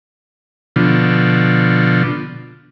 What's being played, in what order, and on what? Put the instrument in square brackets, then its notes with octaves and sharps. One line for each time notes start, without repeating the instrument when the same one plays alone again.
[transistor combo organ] B2 D3 F3